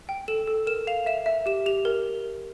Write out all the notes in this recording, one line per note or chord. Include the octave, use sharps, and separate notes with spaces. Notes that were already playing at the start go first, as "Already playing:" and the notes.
G5
A4 E7
A4
A#4 E7
F5 F7
E5 E7
E5
G4 E7
G4 F7
A#4